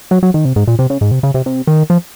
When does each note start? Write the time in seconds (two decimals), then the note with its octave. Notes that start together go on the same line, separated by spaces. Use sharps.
0.11 F#3
0.23 F#3
0.34 D#3
0.45 C3
0.56 G#2
0.67 A#2
0.79 C3
0.90 C#3
1.01 G#2
1.11 C3
1.23 C#3
1.34 C3
1.46 C3
1.67 D#3
1.90 F3